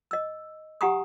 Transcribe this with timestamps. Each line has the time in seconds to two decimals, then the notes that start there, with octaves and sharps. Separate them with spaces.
0.11 D#5 E6
0.81 G4 F#5 G#5 A#5 C#6 D#6